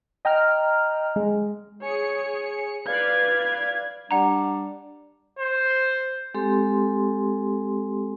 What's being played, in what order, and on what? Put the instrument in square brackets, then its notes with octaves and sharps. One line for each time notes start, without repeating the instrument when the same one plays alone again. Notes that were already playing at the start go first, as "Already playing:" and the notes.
[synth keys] D#5 G5 A#5 F6
G#3
[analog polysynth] G#4 C#7 [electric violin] C#5
[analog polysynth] B4 D5 F5 [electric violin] G#6
[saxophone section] G3 D4 [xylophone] F#5 A#5
[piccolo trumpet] C5
[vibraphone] G#3 C4 G4 A4 C6